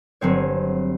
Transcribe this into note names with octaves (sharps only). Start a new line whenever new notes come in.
G1 F#3 C4 C#5